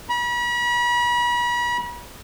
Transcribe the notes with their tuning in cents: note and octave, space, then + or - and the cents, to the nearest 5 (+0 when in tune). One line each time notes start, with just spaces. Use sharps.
B5 -40